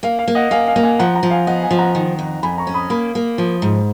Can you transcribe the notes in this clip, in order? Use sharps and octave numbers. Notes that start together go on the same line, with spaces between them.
A#3 F5
F5
A#3
D#5 F#5
A#3 F5 G#5
F5 G#5
A#3
F5 G#5
F3 F#5 A#5
F#5 A#5
F3
F5 G#5
B3 D#5 F#5
F5 G#5
F3
F#5 A#5
D#3
F2
F2 G#5 B5
A#5 C#6
C#4
B5 D#6
A#3 B5 D#6
A#3
F3
G#2